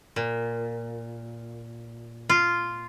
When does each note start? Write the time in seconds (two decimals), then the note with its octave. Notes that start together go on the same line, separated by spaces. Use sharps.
0.16 A#2
2.29 F4